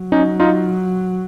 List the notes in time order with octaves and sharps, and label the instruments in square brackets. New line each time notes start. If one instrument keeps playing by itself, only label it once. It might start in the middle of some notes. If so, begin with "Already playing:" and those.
Already playing: [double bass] F#3
[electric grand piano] C#4 D#4
D#4 F4